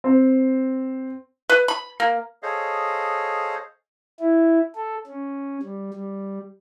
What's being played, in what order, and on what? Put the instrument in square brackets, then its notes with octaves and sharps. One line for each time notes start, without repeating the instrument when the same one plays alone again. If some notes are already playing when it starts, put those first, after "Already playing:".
[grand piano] C4
[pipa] B4
B5
A#3
[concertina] G#4 A4 C5 C#5 D#5 F5
[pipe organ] E4
A4
C#4
G3
G3